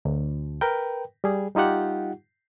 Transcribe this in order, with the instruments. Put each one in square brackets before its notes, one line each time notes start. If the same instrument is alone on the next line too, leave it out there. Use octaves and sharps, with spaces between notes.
[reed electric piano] D2
A#4 B4 G5
G3 G#4
G3 D#4 F4 G4 F#5